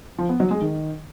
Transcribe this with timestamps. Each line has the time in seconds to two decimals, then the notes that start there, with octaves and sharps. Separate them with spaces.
0.18 F3
0.29 B3
0.40 F#3
0.51 G#3
0.61 D#3